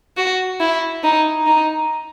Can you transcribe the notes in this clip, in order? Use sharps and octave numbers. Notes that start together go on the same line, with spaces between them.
F#4
E4
D#4
D#4